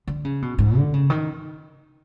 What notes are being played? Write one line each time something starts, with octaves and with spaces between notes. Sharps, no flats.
D3
C#3
B2
G#2
D3
C#3
D#3